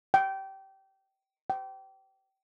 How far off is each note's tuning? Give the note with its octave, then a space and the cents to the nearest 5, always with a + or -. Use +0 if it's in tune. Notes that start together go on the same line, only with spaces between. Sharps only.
G5 -25
G5 -30